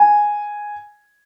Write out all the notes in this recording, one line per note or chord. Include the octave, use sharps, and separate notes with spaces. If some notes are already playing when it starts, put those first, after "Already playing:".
Already playing: G#5